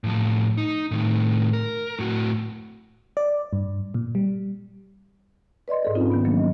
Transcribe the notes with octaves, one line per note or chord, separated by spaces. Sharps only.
A2 F3
D#4
A2 D#3
A#4
A2 F#4
D5
G2
A#2
G3
B4 D5 D#5 C6
G#2 A4 D5
C4 C#4 D#4 F4
D#3 B3 B5
D#3 F3 F#3 A#3 C#4 D4
D#5